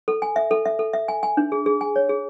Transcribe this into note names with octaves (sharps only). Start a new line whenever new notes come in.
A4
G#5
E5
A4
E5
A4
E5
G#5
G#5
D4
G#4
G#4
G#5
C#5
G#4